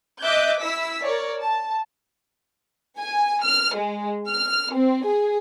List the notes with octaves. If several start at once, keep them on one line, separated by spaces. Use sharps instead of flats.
D#5 E5 D6 F#6 G6
E4 E6 B6
A#4 C#5 D5
A5
G#5
F6
G#3
F6
C4
G#4